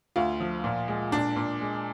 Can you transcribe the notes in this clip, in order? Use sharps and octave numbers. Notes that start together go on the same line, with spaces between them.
D2 F4
F3
A#2
G#3
A#2 D4
A#2
G#3